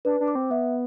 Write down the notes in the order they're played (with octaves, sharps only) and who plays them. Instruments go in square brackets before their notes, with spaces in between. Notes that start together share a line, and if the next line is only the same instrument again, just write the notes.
[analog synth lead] D4 [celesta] B4
[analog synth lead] D4
[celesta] D6
[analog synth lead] C4
[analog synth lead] B3 [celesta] E5